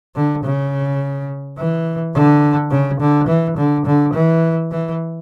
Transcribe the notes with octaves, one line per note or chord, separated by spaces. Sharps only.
D3
C#3
E3
D3
C#3
D3
E3
D3
D3
E3
E3